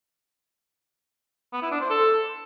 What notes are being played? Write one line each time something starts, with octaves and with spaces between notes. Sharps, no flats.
B3
E4
D4
C5
A4